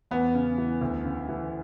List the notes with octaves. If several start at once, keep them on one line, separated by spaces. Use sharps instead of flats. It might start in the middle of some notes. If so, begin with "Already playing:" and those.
E2 B3
C#3
E3
D2
C#3
E3